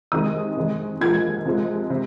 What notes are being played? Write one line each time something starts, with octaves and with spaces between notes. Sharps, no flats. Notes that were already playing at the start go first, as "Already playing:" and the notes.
C3 D#3 G#3 D#6
C3 D#3 G#3
A#2 F3 G#3 G#6
C3 F3 G#3
C3